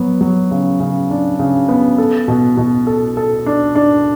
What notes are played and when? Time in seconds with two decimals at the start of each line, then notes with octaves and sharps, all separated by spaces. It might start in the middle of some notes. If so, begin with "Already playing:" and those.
Already playing: F#3 B3
0.21 F#3
0.51 C#3
0.80 C#3
1.10 D4
1.39 C#3
1.69 B3
1.98 A4
2.28 B2
2.57 B2
2.87 A4
3.17 A4
3.46 D4
3.75 D4